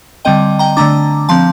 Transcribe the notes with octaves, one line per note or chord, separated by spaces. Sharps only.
D3 G3 C4 D#5 G5
G5 A#5
D3 A3 D4 A#5 D6
F3 C4 A5 C6